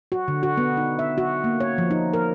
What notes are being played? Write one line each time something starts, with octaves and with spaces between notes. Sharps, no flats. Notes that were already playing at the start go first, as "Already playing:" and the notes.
F#4
D3
F#4
B3
D#4
E5
F#4
A#3
C#5
F3
D#4
A#4